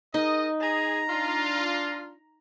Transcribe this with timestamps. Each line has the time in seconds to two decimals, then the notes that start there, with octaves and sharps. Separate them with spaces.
0.14 D#4 G#4 A#4 D#5
0.61 G#4 A#5
1.09 D4 F4